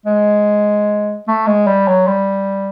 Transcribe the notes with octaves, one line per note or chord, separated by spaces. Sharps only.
G#3
A3
G#3
G3
F#3
G3